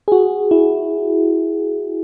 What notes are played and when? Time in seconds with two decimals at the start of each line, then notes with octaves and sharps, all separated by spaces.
0.08 G#4
0.12 F#4
0.51 E4